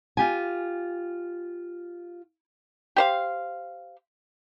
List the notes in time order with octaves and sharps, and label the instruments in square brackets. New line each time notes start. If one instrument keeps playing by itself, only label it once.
[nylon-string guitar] F4 G4 G#5
[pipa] G4 C5 F5